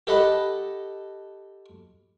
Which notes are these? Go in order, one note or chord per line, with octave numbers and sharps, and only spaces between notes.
G4 A4 D#5 F#5 B5